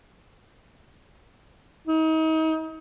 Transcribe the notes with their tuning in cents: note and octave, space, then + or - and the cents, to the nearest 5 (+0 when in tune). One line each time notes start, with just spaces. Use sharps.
D#4 +35